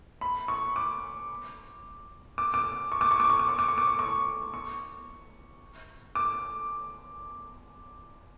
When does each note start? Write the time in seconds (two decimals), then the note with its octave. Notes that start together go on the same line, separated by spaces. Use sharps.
0.21 B5
0.48 C#6
0.76 D6
2.38 D6
2.54 D6
2.92 C#6
3.01 D6
3.11 C#6
3.20 D6
3.30 C#6
3.39 D6
3.49 C#6
3.59 D6
3.69 C#6
3.78 D6
3.87 C#6
3.99 C#6
4.54 C#6
6.15 D6